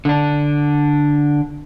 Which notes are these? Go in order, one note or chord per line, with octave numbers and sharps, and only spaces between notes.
D3 D4